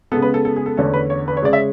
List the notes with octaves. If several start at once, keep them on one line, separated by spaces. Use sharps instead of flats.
C#3 G#3 B3 A4
B4
A4
A4
G#4
A4
E2 D3 A3 C#4 A4
B4
C#5
B4
C#5
C#3 G#3 C#4 D5
E5